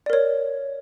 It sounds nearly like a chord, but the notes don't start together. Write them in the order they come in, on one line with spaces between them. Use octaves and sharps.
D5 A#4 C#5